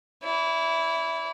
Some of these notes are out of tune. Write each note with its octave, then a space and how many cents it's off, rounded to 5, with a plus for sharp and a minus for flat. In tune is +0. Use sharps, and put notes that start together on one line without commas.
E4 +0 D5 -45